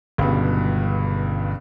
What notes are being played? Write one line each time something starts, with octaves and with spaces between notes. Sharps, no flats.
G1 C#2 G2 B2